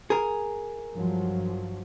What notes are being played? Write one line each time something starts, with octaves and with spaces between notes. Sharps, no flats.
G#4 A#4
G2 F3 F#3